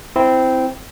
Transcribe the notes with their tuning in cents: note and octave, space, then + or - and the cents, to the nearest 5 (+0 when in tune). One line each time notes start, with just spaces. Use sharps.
C4 -10 E4 +0